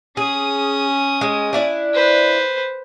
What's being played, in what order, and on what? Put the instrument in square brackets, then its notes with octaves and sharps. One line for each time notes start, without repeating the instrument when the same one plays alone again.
[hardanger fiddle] C#4 D#6 [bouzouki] G#4
[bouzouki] G#3
D4 E4 D5
[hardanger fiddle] B4 C5